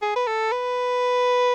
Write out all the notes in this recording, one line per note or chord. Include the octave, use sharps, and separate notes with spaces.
G#4
B4
A4
B4